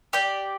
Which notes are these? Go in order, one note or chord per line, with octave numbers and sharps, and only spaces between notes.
G4 D5 G5